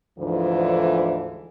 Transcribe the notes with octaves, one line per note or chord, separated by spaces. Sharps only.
D2 G#2 D3 E3 F3